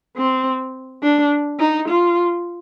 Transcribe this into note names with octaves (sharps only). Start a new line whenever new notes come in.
C4
D4
D#4
F4